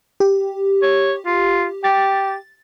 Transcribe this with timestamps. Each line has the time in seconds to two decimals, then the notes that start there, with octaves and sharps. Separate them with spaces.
0.20 G4
0.83 C#5
1.26 F4
1.84 G4 A6